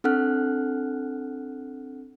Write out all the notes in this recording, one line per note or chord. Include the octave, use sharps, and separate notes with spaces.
C4 D4 A4 F#5 F6 F#6